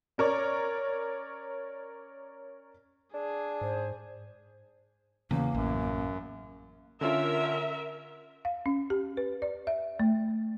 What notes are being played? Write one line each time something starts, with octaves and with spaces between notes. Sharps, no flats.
C#4 A#4 C#5 D5
D4 G#4
G#2 C5
E2 C#3 A#3
A1 F#2
D3 C#4 F4 A#4 E5
F5
C#4
G4
B4
D5
E5
A3